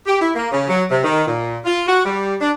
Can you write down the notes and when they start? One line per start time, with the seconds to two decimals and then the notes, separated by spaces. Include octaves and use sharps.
0.07 G4
0.21 E4
0.35 A#3
0.52 C#3
0.68 F#3
0.91 C3
1.04 D#3
1.27 A#2
1.65 F4
1.87 F#4
2.05 G3
2.41 D4